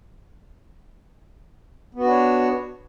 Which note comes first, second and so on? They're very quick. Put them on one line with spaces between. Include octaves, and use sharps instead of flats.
B3 F#4 D4 C#5